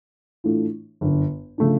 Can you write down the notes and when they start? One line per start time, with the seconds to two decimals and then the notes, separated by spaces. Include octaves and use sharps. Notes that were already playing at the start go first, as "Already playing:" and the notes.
0.44 A2 E3 A3 D4 F4
1.01 G1 F#2 D3
1.58 C#3 F3 A3 D4